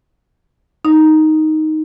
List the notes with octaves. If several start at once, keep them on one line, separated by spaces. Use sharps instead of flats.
D#4